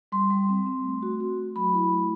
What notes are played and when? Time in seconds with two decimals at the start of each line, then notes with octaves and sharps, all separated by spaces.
0.12 G3 C6
0.30 G3
0.49 C4
0.66 C4
0.84 A3
1.02 F#4
1.20 F#4
1.38 A3
1.56 F#3 B5
1.73 E4
1.92 A3